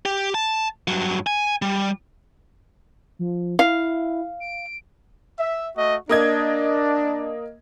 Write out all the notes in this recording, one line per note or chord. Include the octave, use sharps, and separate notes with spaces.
G4
A5
G2 F#3
G#5
G3
F3
E4 F5
D7
E5
A3 F#4 D#5
A#3 D4 D#5 G#6